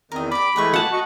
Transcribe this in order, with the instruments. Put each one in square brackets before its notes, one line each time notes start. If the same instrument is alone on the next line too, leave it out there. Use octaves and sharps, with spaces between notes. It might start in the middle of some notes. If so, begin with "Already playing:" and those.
[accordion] E2 D#3 [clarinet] C4 [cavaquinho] A#4 D#5
[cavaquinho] G4 D5 [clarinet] B5 [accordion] D6
[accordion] E3 G#3 A3 [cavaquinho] G4 B4 C#6
[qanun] F#5 A5
[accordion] F#4 C#6 [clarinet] D#5